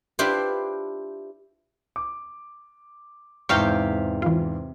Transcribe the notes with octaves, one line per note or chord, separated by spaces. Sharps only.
D4 E4 F4 G4 B4 C5
D6
E2 G#2 C3 F5 G5 C#6 F6 G6
E3 F4